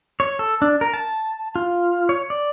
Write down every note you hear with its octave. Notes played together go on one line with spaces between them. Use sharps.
C#5
A4
D4
A#4
A5
F4
C#5
D5